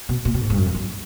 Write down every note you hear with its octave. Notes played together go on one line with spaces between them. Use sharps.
B2
A#2
B2
G#2
G2
F#2
F2
F#2